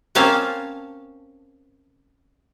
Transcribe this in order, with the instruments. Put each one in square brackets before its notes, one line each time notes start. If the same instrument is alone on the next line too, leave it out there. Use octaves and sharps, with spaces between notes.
[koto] A#3 C4 C#4 C5 F5 A5